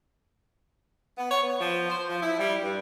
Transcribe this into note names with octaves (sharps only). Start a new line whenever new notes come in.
B3
C#5
B3
F3
C5
F3
E4
G3
G2